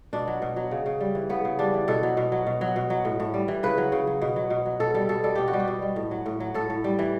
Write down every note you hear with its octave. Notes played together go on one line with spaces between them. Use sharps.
B2 D4
F#3
B2
F#3
C#3
C#3
G3
E3
C#3 B3
C#3
G3 D4
E3
B2 A4
F#3
B2
F#3
B2
F#3
B2
F#3
A2
A2
G3
E3
C#3 B4
F#3
C#3
F#3
B2
F#3
B2
F#3
B2 A4
G3 A4
B2 A4
G3 A4
B2 G4
F#4
G3
G4
B2
G3
A2
F#3
A2
F#3
A2 A4
A2
G3
E3